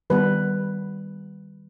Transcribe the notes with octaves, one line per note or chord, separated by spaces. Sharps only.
D#3 G3 B3 B4